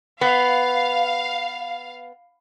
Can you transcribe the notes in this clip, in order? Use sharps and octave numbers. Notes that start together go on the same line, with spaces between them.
B3 F5